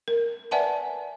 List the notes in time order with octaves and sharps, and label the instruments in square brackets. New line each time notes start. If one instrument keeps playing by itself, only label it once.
[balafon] A#4
B4 D5 E5 F#5 G#5 A5